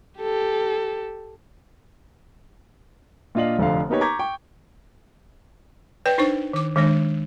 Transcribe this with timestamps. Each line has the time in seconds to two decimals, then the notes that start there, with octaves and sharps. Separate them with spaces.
0.19 G4 A4
3.35 A#2 D4 F4 D#5 F5 F#7
3.59 F1 D3 F3 F5
3.89 A#3 B3 D#4 G4 B4 C#5
4.01 A#5 C#6 D6 G6 G#6 B6
4.19 G5 C#6
6.06 B4 C#5 D5 G5
6.18 D4 D#4 C5 C#6
6.53 D#3 D6
6.76 D#3 G#3 D4 C#5